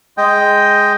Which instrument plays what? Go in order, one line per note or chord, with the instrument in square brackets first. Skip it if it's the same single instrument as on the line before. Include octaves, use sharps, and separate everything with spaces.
[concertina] G#3 D#5 G5